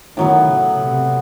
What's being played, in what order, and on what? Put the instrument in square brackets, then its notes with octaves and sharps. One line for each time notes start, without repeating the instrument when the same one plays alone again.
[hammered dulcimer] A2 F#3 B3 [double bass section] D#3
[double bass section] C#3
C3